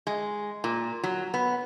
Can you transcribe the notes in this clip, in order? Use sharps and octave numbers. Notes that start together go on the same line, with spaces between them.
G#3
A#2
F#3
B3